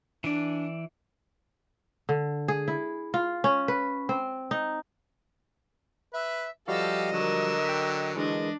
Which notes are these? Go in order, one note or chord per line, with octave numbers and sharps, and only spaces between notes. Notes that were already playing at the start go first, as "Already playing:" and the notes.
E3 D4 D5
D3
G#4
E4
F4
C#4
B4
C4
D#4
B4 E5
F3 G3 F#4 G4 A4 D#5 F5 E6
D3 F#3 A#4 E7
G5 B6
E3 G#3 D4 A#4 D#5